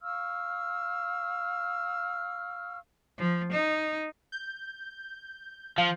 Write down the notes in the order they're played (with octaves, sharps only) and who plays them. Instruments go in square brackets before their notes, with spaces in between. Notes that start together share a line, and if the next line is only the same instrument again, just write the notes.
[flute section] F5 C#6 E6 F6
[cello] F3
D#4
[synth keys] G6
[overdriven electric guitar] F3 [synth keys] F5